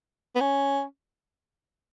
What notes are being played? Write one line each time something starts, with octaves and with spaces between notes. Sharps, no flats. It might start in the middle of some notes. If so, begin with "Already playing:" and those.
B3
C#4